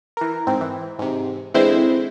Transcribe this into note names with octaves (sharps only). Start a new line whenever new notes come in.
E3 A#4
G#2 C4
E3
G#2 C3
D3 E3 G#3 C4 E4 C5